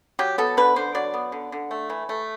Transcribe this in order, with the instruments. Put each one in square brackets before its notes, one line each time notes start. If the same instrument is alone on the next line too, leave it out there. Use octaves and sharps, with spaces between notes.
[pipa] F#3 G4
B3 A4
D3 B4
D3 C5
F#3 D5
B3
D3
D3
A3
E3
A3